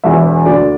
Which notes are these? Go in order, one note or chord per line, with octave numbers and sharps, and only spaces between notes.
E1 E2 E3 E5
D2 D3 D5